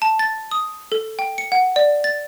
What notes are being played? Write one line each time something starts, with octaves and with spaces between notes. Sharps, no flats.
A5
A6
D#6
A4
G5
C#7
F#5
D5
A6